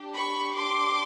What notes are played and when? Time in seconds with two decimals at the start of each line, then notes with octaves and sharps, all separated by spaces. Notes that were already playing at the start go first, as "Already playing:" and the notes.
Already playing: D4 G4
0.14 B5 C#6
0.55 C6 D6